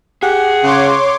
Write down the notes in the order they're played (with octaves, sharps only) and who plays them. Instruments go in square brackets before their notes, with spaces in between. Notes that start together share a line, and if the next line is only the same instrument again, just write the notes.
[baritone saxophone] G4 [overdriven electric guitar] G#4 [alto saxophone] F#5
[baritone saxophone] C#3 [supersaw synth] C#5 C6 D6